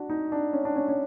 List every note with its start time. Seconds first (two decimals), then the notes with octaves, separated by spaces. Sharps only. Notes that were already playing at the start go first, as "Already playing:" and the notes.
Already playing: D4 F#4
0.10 D#4
0.32 D4
0.53 C#4
0.65 D4
0.76 C#4
0.88 C#4